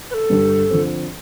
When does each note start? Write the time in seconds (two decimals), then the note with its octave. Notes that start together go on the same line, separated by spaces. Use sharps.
0.11 B4
0.14 A4
0.30 G2 D3 G3 D4
0.70 D3 F3 C4